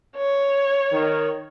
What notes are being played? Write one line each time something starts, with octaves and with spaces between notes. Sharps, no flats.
C#5
D#3